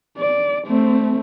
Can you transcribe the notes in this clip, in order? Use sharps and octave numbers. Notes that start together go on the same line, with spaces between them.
D5
A3 C4